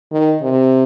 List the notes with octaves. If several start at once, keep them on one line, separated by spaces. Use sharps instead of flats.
D#3
C3